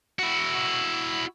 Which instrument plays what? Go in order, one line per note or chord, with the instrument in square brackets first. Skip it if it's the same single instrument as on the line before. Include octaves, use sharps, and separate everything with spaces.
[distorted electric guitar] E4 F#4